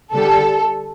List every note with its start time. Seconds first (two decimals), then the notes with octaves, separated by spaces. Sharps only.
0.12 D3 G3 A4